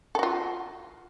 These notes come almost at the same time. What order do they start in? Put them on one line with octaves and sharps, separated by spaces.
A4 F#4 F4